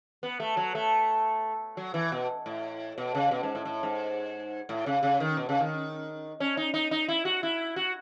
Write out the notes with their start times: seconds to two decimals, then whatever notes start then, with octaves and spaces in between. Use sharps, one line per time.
0.23 B3
0.40 A3
0.57 F#3
0.75 A3
1.77 F#3
1.94 E3
2.12 B2
2.46 A2
2.98 B2
3.15 C#3
3.31 B2
3.43 G#2
3.55 A2
3.65 A2
3.83 G#2
4.69 A2
4.86 C#3
5.03 C#3
5.20 D#3
5.37 B2
5.49 C#3
5.60 D#3
6.40 C#4
6.57 D#4
6.74 D#4
6.91 D#4
7.08 E4
7.25 F#4
7.43 E4
7.76 F#4